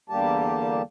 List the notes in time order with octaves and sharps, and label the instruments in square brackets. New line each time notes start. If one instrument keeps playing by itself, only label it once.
[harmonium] E2 D3 G3 A#3 G4 A5